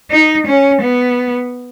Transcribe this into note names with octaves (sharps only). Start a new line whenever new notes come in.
D#4
C#4
B3